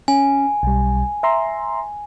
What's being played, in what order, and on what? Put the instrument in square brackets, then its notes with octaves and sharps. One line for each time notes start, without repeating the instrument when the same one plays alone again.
[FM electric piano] C#4 [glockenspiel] G#5
[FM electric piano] B1 G3
E5 A#5 C6